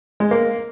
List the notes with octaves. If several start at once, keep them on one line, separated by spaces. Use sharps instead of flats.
G#3
A#3